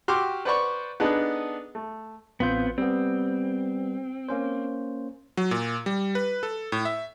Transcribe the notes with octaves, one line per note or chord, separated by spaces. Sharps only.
F#4 G4 C6 D6 E6 F6
B4 C5 D5 F#5 B5 C#6
B3 D4 D#4 G#4 A4 B4
A3
A1 B3 C4 F4 G6
G3 B3 C4
A#3 C#4 C5
F#3
A#2
G3
B4
A4
A2
E5